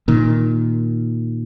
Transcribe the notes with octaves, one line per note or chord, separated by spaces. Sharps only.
A#2 D#3